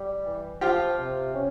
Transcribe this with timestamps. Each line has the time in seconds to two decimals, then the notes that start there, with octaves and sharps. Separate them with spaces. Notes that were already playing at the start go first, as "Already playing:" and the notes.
Already playing: G3
0.25 E3
0.61 F3 F4 G4
0.98 C3
1.34 C#4